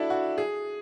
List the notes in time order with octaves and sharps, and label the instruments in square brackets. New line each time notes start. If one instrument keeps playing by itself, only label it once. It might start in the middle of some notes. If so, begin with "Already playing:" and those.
Already playing: [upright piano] D4 E4 F#4 A4
F#4
G#4